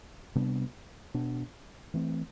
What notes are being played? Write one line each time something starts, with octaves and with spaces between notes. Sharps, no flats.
C3 G3 B3 D4
B2 B3 D4
E3 A3 C4